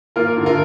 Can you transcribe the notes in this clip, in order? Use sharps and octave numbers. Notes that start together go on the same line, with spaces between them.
A#3 F4 A#4
D3
F4 A#4